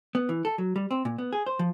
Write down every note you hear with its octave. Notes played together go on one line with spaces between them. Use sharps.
B3
E3
A4
F#3
G3
C4
A#2
B3
G#4
C5
F3